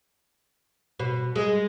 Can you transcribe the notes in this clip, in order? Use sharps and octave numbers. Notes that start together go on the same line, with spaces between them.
B2
G#3